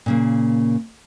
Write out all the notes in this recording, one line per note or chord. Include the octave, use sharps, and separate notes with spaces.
A#2 C#3 A#3